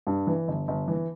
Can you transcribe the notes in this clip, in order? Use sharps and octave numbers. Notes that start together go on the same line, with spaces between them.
G2
E3
G1
G1
E3